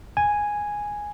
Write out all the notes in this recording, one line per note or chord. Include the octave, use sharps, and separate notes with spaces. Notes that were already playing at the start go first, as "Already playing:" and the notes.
G#5